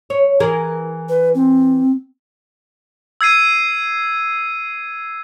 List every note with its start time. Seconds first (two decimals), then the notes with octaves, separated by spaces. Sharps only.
0.10 C#5
0.40 E3 G#4 A#4
1.09 B4
1.35 C4
3.21 E6 G#6 C7 D#7